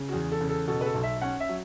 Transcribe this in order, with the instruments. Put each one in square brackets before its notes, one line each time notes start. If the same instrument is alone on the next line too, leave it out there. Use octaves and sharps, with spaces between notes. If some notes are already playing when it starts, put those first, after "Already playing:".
Already playing: [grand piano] C#3
[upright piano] F#4
[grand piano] E2 [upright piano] G#4
[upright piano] A4
[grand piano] C#3
[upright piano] A4
[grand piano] B2 [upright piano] A4
[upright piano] B4
A4
[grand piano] B1
[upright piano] E5
[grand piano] C#4 [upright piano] F#5
[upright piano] E5
[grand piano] F#3